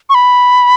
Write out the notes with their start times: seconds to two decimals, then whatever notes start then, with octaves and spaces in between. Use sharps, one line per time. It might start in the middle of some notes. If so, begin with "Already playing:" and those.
0.10 C#6
0.15 B5